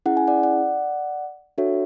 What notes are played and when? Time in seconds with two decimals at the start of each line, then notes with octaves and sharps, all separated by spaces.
0.06 C#4 E4 G#4 F#5
0.17 G#5
0.28 D5 F#5
0.43 D5 F#5
1.58 D4 F#4 A4 C#5 E5